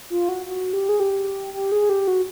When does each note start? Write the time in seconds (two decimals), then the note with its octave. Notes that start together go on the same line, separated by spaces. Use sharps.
0.10 F4
0.29 F#4
0.46 F#4
0.73 G4
0.89 G#4
1.00 G4
1.54 G4
1.72 G#4
1.89 G4
2.08 F#4